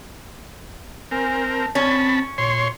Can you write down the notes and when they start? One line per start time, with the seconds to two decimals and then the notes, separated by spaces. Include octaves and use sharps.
1.11 C4 A#4 G#5
1.48 A5
1.75 C4 C#4 A5 B5
2.38 A#2 C#5 C6